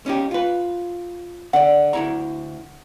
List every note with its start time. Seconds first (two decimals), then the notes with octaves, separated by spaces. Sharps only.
0.06 C#4 D#4 G4
0.31 F4 B4
1.53 D3 D5 F#5
1.93 D2 E4 A#5